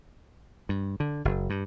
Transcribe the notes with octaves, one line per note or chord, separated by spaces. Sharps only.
G2
D3
F#1
G2